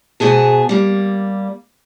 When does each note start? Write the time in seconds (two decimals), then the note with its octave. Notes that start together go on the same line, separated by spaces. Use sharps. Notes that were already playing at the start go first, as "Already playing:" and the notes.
0.20 G#2 B2 G#4 A5
0.69 G3 A#3